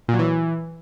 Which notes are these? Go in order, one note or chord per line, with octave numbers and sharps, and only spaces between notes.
A#2
F#3
E3